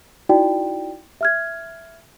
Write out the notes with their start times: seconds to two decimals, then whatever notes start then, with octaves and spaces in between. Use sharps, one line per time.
0.29 D#4 E4 F#4 D5 G5
1.21 E5 F6 G#6